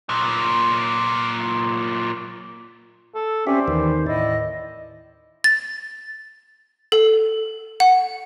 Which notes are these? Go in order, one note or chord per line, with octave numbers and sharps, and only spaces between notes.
A#2 F#3
A4
C4 C#4 G4 C5 D5 E5
D#2 D#3 E3
A2 E4 D5 D#5
A6
A4
F#5